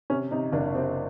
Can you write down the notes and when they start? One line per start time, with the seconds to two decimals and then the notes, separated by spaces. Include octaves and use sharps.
0.10 C3 C#4
0.31 C3 D#4
0.52 F#1 D4
0.74 C3 C4